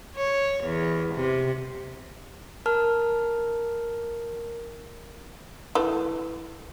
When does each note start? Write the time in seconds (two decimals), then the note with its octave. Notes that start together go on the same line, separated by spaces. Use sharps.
0.16 C#5
0.64 E2
1.15 C3
2.66 A#4 A5 F6
5.75 E3 A3